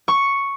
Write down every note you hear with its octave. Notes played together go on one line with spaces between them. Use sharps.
C#6